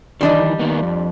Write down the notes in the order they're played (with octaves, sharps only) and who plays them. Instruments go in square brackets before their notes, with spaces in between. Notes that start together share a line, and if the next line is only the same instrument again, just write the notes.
[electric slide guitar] D#3 E3 [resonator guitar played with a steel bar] G3 D4 D#5
[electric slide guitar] D#3 A#3 B3
F2